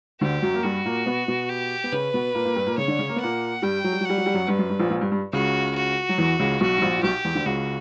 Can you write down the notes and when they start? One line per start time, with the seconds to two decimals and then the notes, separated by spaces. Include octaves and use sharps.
0.21 D2 D3 G4
0.42 F#2 F#3
0.54 A#3
0.64 G2 G3 F#4
0.85 A#2 A#3
1.06 B2 B3
1.28 B2 B3
1.49 G4
1.84 B3
1.92 C#3 C#4 B4
2.14 B2 B3
2.35 A#2 A#3
2.45 A#2 A#3
2.56 G2 G3
2.66 A#2 A#3
2.78 C#3 C#4 C#5
2.88 D3 D4
2.99 C#3 C#4
3.09 A#3
3.16 B3
3.20 A#2 A#3 F#5
3.62 G2 G3 G5
3.84 F#3
3.92 G3
4.01 F#3
4.05 G3 F#5
4.18 F#3
4.26 G3
4.34 F#2 F#3
4.47 G2 B4
4.59 F#2
4.70 G2
4.80 A#1 A#2
4.90 A#1 A#2
5.01 G2
5.12 G2
5.33 C#2 C#3 F#4
5.75 F#4
6.09 F#3
6.18 E2 E3
6.39 C#2 C#3
6.61 B1 B2 F#4
6.78 G2
6.82 A#1 A#2
6.98 A#2
7.03 B1 B2 G4
7.25 E2 E3
7.35 D2 D3
7.46 C#2 C#3 F#4